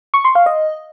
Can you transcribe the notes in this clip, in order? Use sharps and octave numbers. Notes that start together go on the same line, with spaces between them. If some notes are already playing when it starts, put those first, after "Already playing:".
C#6
C6
F5
D#5